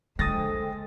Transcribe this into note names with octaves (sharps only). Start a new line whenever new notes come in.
D3 G#3 A4 C5 G5 D#6 A6 A#6